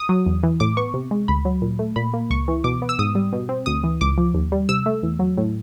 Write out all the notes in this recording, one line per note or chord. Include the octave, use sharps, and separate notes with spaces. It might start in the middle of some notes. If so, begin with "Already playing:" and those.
Already playing: D#6
F#3
E2
E3
A2 D6
B3 C#6
C3
G#3
D2 B5
F#3
A#2
A3
A#2 B5
A#3
C#2 C#6
E3
B2 D6
B3
E6
G#2 D#6
G3
B2
C4
D2 D#6
E3
C#2 D6
F3
D#2
G3
C3 E6
A3
E2
F#3
A2